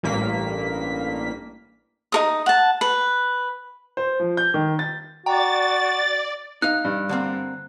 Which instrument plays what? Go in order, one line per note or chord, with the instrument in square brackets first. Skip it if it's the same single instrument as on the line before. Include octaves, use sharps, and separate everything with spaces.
[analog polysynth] A1 G2 A#3 B6
[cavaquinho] D#4 A#4 D#6
F#5 A5
B4
[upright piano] C5
F3
G6
D#3
A6
[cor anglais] F#4 [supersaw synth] D5 [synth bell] G5 A#5 [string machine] A6
[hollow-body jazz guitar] D#4 D#5 F5 [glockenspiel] F#6
[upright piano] G2
[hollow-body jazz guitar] D3 A#3 C4